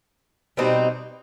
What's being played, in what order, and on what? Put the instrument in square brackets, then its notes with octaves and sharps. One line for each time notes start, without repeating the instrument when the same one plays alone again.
[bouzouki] B2 G3 C4 D#4